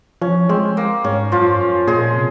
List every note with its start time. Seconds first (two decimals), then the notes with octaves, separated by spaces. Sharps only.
0.22 F3 C#4
0.49 G#3 C4
0.77 A#3
1.04 G#2 C#4
1.32 F#2 F3 F4
1.49 G#2
1.59 F#2
1.87 A#2 G#3 G#4
2.15 C3